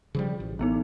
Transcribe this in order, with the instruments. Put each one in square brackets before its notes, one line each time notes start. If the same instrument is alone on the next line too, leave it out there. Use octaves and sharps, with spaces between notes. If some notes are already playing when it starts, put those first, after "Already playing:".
[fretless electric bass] C#3 F3 G3
A1
[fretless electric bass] A1 [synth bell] E3 B3 D#4